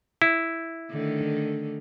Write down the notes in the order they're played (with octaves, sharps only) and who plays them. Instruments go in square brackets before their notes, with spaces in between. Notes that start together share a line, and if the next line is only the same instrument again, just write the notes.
[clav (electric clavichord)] E4
[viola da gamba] D3 D#3 A3